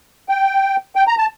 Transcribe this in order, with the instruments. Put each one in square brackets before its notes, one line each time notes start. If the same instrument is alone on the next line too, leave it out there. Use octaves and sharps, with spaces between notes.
[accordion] G5
G5
A#5
A5